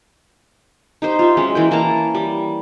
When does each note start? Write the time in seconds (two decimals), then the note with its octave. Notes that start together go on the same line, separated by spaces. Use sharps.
1.02 D#4 G4 C5
1.19 F4 E5
1.37 F#3 G#3 C#4
1.55 E3 A#3 G5
1.71 E3 A#3 A5 A#5
2.15 G3